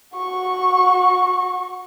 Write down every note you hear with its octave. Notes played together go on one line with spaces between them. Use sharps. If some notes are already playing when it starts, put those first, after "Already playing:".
F#4 C#6